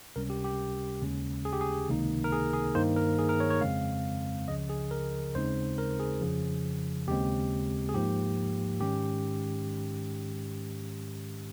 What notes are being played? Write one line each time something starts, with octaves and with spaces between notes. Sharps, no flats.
C#2 C3 G3 C#4 A#4
G4
G4
D#2 C#3 G#3 C#4
G#4
G4
G#4
C#2 C3 D#3 A#3 D#4
A#4
G#4
G#4
G2 D#3 A#3 D#4 C5
A#4
G#4
A#4
C#5
C#5
F2 C#3 G#3 C4 F5
C#2 C#3 F3 D#5
G#4
A#4
D#2 C#3 G#3 C4 D#4 C5
A#4
G#4
F2 C#3 F3
D#2 C#3 G#3 C4 G4
G#4
G#2 F3 A#3 G4
G#2 D#3 G#3 C#4 G4